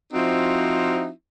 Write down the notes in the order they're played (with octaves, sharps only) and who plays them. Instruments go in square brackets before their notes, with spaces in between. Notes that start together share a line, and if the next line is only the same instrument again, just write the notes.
[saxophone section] F3 C4 D#4 E4 F#4